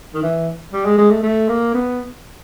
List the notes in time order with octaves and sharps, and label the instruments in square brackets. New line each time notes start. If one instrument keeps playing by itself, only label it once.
[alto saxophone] D#3
E3
G3
G#3
G#3
A3
A3
A#3
B3